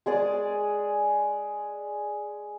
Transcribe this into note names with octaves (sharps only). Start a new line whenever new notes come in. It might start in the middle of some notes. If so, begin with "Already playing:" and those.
G#3 G#4 D5 G#5